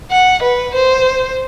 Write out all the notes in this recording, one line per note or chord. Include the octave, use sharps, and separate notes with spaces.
F#5
B4
C5